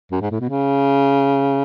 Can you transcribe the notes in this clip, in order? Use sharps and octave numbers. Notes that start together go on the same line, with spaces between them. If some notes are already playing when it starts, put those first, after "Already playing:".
F#2
G#2
A2
B2
C#3